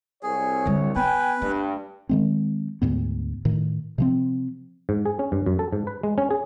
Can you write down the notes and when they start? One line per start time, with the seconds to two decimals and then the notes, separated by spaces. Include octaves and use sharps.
0.23 C2 G#4 C#5
0.66 D3 G3
0.96 B3 B4 G5 G#5
1.42 G2 A3
2.09 D#3 G#3 C4
2.82 D2 G#2 B3
3.45 A2 D#3
3.98 C3 F3 C4
4.89 G#2
5.05 G#4
5.19 C#4
5.32 G2
5.46 F#2
5.59 A4
5.72 G#2
5.87 B4
6.03 G#3
6.18 C#4
6.30 G#4